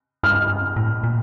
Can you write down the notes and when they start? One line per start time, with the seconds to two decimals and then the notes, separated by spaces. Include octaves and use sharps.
0.23 G2 F6
0.76 A2
1.04 A#2